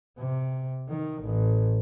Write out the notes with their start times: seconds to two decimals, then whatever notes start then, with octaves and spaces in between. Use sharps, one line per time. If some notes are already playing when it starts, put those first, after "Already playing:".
0.18 C3
0.89 D#3
1.22 A1